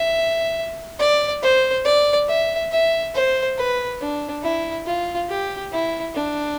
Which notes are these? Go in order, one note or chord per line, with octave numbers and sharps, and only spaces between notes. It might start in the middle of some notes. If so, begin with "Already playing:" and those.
Already playing: E5
D5
C5
D5
E5
E5
C5
B4
D4
E4
F4
G4
E4
D4